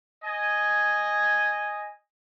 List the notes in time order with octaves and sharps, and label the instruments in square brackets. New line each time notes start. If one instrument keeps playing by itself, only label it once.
[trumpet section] D#5 G#5